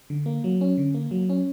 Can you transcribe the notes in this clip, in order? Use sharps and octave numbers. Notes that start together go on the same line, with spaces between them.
D3
A#3
F#3
C#4
D3
A#3
F#3
C#4